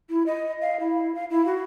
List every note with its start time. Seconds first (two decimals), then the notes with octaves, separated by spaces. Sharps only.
0.09 E4
0.26 D#5
0.61 F5
0.80 E4
1.15 F5
1.30 E4
1.46 F#4